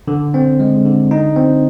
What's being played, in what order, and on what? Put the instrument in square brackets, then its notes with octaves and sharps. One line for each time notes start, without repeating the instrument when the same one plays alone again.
[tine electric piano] D3
C4
G#3
D3
D#4
C4